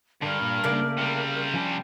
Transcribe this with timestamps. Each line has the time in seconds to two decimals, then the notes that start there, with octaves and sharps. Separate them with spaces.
0.22 G2 D3 G3 A#4
0.42 A#2
0.64 C#3 A3 A#3 D5
0.98 C3 G3
1.54 F3 C#4 D4